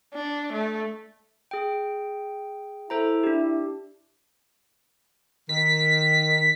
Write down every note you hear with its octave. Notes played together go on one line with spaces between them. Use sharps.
D4
A3
G#4 G5
E4 A4 C5 A#5
D4 G4
D#3 B6